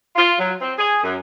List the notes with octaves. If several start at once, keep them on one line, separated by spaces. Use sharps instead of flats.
F4
F#3
C4
G#4
F#2